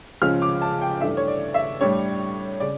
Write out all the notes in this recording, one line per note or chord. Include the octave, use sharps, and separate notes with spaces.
C#2 C#3 F3 C#4 F6
D6
A5
G5
G2 E3 A3 D4 E5
C#5
D5
E5
A2 G3 D4 C#5
C#3 D5